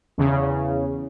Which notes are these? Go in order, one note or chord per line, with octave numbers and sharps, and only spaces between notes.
E2 C#3